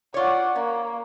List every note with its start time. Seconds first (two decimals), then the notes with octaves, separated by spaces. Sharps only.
0.14 F4 C#5 D5 F#5
0.55 A#3 C#4